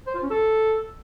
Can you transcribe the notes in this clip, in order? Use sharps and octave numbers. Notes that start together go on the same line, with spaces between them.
C5
F4
C#4
A4